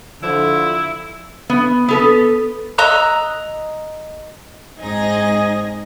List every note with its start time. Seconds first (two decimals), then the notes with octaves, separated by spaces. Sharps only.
0.23 D3 F3 E4
1.50 B3
1.88 B3 A4 B4
2.78 D#5 A#5 E6 F#6
4.80 G#2 C4 D#4 G#4 D#5 G#6 A#6